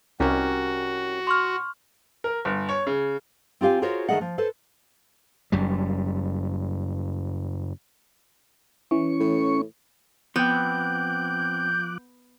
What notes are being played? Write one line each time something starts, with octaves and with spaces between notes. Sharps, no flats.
C2 C#4 F#4 G4 A#4
C6 C#6 F6
A#4
G1
C#5
C#3
C4 F4 G4 F5 G#5
F4 F#4 G#4 A#4 C5 C#5
D#3 A3 G#4 D#5 F#5
F3
A4 B4 C5
F#1 F#2 G3
E3 C#4 C#6
A2
F3 B3 C4 G5 D6 F#6 G6